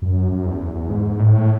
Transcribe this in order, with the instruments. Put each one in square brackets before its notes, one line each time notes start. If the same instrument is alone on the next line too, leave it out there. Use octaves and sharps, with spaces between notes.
[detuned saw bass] F#2
F#2
E2
E2
E2
G#2
A2